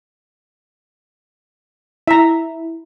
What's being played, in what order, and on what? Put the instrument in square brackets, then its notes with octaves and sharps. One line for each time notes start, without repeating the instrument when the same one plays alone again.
[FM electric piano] E4 [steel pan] E5 A#5